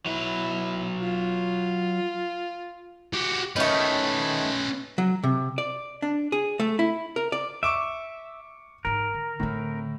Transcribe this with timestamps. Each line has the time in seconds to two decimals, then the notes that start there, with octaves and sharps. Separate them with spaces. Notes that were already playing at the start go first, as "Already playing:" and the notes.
0.06 F#3 E4 B4
1.01 F4
3.13 F#4 G4
3.56 D#3 A3 C#4 B4
4.98 F#3
5.23 C3
5.58 D5
6.02 D4
6.32 G#4
6.60 A3
6.79 E4
7.16 A#4
7.32 D5
7.63 E5 C#6 D6 D7
8.85 G#2 D#4 A#4
9.14 D3
9.40 A2 D3 C4